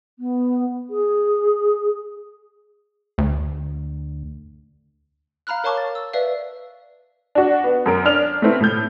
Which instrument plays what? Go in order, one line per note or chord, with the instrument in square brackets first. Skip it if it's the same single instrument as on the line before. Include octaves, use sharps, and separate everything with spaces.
[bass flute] B3
G#4
[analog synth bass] D2
[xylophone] F5 A#5 B5 F6 F#6
A#4 C#5 F5 A5 C#6 D6
A6
E6
B4 D5 E5 F5
[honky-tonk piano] D4 F#4
B3
F#2 A#4 D7
D4 F6 F7
A3 B3 C4 E4
A2 G6